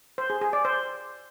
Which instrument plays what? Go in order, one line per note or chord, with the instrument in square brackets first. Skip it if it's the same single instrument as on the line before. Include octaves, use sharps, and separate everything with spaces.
[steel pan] C5
G#4
G#4
D5
C5